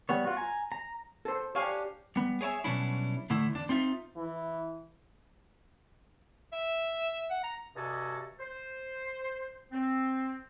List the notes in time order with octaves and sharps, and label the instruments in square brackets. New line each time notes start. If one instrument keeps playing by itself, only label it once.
[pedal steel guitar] G3 B3 C#5
F4 F#4
G#5 A#5
A#5
[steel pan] A4 C5
[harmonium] D4 G4 [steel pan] C#5 F5 G#5
[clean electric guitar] G3 B3
G#4 C#5 D5 E5 G#5
B2 F#3 G3 C#4 D4 E4
A2 D3 A3 E4
E2 D4
C4 D#4 F4 E5
[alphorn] E3
[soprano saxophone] E5
F#5
A#5
[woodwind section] G2 C3 F#4 A4 D#5 G#5
C5
C4